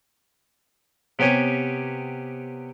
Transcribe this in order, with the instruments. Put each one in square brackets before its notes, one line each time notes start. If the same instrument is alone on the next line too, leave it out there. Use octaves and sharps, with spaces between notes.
[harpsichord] C3 B3 G4 C#5 G#5